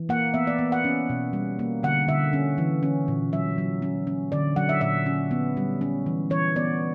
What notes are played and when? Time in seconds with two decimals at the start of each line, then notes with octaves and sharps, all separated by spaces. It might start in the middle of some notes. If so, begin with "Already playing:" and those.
Already playing: E3
0.09 A#3 F#5
0.34 B3 E5
0.47 D5
0.59 B3
0.72 F#5
0.84 C#4
1.09 B2
1.33 G3
1.59 A#3
1.83 D3 F#5
2.08 D3 E5
2.33 C#4
2.58 E3
2.83 C#4
3.08 A#2
3.33 F#3 E5
3.58 F#3
3.82 C#4
4.07 C#4
4.32 D3 D5
4.56 F#3 F#5
4.69 E5
4.81 A#2 E5
5.06 C#4
5.31 B3
5.57 G3
5.81 C#4
6.06 E3
6.30 E3 C#5
6.56 B3 D5